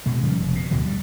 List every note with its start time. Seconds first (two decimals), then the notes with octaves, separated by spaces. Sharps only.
0.06 B2 G#3
0.23 C#3 F3 G3
0.39 F1
0.55 B2
0.71 D2 B2 D3 F#3
0.86 G3